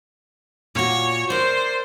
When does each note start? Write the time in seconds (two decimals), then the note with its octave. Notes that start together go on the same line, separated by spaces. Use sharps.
0.75 A#2 F#4 C#5
1.30 A#4 C5 D5